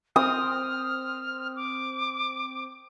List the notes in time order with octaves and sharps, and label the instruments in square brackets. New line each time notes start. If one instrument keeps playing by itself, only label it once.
[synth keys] C4 [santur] D#6 [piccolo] F6
[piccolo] D6